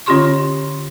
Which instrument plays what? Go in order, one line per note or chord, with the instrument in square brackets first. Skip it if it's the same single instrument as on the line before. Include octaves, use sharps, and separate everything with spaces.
[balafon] D3 C#4 F4 G4 C6 C#6